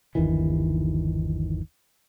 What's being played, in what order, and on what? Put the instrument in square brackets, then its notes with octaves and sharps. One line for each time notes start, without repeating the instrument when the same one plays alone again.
[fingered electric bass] G1 D#2 D#3 E3